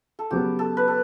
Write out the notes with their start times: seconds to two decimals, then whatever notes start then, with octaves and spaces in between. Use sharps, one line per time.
0.19 A4
0.31 C#3 F#3 B3 G4
0.59 A4
0.77 B4
0.88 A4